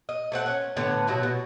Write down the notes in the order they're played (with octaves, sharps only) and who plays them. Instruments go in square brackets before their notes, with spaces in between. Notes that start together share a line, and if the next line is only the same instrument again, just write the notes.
[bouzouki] D#5
A3 C4 F#5
C#4
A2 D3 B3 B4
B2 F#3 E4
B2